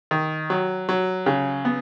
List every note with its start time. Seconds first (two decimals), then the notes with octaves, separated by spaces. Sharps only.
0.11 D#3
0.50 F#3
0.89 F#3
1.26 C#3
1.65 B3